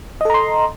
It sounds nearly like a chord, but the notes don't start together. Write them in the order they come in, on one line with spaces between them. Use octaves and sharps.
D#5 A4 A#5 C6